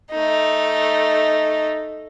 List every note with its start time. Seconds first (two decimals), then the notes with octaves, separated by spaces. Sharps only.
0.11 A3 D#4